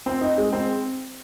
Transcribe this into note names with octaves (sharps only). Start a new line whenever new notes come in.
C4
D#4
G#3
C4